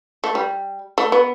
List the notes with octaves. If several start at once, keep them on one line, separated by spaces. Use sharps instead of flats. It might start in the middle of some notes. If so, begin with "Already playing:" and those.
A3
G3
A3
B3